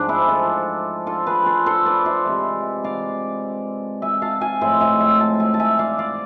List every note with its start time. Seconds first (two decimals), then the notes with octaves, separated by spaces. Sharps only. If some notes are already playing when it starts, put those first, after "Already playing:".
Already playing: G#2 F3 G#3 D4
0.08 E4 G#4
0.28 F4 A4
1.07 F4 A4
1.27 G#4 B4
1.46 A4 C5
1.66 A4 C5
1.85 B4 D5
2.06 C5 E5
2.25 C3 E3 G#3
2.84 D5 F5
4.02 E5 G#5
4.22 F5 A5
4.41 E5 G#5
4.61 A2 F3 G#3 C5 E5
4.81 E5 G#5
5.00 E5 G#5
5.20 F5 A5
5.40 E5 G#5
5.54 A5
5.60 E5 G#5
5.79 D5 F5
5.99 D5 F5